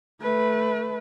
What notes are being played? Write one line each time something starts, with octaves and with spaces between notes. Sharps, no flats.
A3 B4